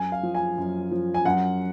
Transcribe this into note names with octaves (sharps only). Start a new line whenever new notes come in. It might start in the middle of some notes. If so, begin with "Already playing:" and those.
Already playing: F#2 G#5
F5
F3
G#5
F#2
F3
G#5
F#2 F#5